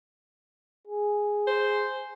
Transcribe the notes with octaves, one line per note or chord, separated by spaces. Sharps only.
G#4
C5